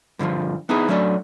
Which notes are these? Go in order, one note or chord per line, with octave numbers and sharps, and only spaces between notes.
G2 D3 E3 F3
B3 D#4 E4 G#4
F#3 A3 C#4 D4 D5